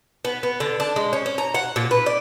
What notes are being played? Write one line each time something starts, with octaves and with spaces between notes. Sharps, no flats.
B3
B3
D3
D4
G#3
C#4
C#4
A#5
F#5
A#2
B4
D5